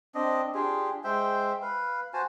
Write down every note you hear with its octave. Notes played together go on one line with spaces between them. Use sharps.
C4 D4 D#5
D4 F4 G4 G#4
G#3 C5 E5 G5
B4 F5
F#4 C5 G#5 A5